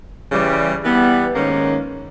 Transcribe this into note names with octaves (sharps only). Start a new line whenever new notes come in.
C#3 E3 G3
E3 G3 B3
G#2 D#3 A#3 C#4